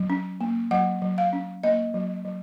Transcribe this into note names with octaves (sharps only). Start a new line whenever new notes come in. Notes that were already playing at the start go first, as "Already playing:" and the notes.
Already playing: F#3
C#4
A#3
F#3 F#5
F#3
F5
C#4
A#3 D#5
F#3
F#3